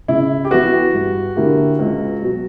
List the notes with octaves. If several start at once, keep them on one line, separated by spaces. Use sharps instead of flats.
C#3 E4
G4
E3 B3 F#4
G2
D3 A#3 E4 G4
C#2
B2 F#3